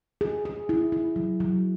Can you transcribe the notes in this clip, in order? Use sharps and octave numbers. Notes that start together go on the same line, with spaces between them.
G#4
G#4
E4
E4
F#3
F#3